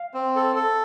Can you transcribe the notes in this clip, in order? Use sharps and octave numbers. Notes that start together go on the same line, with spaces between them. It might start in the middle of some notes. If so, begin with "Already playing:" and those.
Already playing: F5
C4
A4
A4